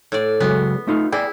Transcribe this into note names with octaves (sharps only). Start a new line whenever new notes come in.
A2 D5
C#3 F#3 G#3 B3
A3 D#4 F4
E4 G#4 D5 G5